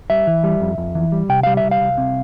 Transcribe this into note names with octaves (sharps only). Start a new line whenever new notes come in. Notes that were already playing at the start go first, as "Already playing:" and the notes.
G3 E5
E3
G3
F2
F2
E3
G3
C3 G5
G3 F5
E5
C2
F5
C2
C3